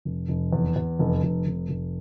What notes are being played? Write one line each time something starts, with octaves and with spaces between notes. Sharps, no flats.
F1
F1
E2
E2
F1
F1
F1
F1